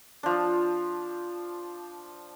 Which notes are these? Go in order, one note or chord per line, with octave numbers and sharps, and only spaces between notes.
F3 D4